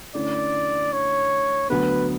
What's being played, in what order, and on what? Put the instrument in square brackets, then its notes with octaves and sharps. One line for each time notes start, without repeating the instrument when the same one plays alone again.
[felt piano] D3 A3 C#4 E4 [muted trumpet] D5
[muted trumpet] C#5
[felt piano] D2 D3 F#3 B3 [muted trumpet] B4